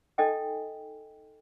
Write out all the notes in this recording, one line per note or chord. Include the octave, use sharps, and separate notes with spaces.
D#4 A4 D#5 G5 G#5